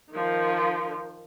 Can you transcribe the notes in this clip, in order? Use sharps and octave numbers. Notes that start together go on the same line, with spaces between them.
D#3 F3